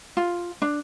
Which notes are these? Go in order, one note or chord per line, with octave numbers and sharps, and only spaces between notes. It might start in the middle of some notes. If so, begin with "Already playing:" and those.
F4
D4